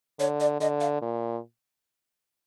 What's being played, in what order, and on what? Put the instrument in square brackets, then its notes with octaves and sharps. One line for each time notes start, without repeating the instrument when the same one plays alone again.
[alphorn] D3 [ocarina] C#5
[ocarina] D5
[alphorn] D3 [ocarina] D#5
[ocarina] F5
[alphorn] A#2